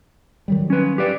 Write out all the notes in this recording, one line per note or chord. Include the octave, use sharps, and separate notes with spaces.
D#3 F#3 G3
C#4 B4
G4 B4 D5